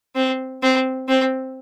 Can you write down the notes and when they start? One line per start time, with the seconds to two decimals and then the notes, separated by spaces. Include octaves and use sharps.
0.16 C4
0.62 C4
1.09 C4